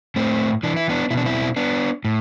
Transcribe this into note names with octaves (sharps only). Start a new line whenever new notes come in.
A2 A3 C4
E3 D4
E4
B3 D4
B2 E4
D4
C4 E4
B3 D4
A2